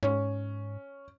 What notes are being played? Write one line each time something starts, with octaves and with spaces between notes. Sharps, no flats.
G#2 C#4